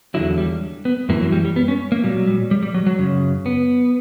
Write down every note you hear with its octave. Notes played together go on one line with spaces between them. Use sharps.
E2 D3 F#3 E4
G3
B3
F#2 E3 A#3
F#3
G3
G3
B3
C#4
A#3
A#2 F#3 G3
G3
G3
G3
F#3
F#3
F#2 C#3
B3